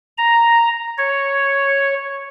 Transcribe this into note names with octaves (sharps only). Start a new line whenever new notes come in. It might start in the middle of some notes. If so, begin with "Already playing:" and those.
A#5
C#5